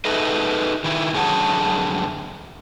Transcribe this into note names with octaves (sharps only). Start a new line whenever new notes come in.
D#4 G#4 A4 B4 D#5 E5
D#3 E4
F#2 D3 G#4 C#5 F#5 A5